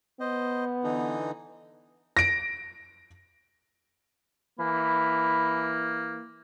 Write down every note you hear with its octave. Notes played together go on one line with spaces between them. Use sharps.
B3 C5 D#5
D3 E3 D#4
A#6 D7
E3 A#3 B5